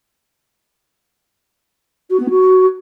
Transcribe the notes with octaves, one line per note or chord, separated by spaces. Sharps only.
F#4
B3
F#4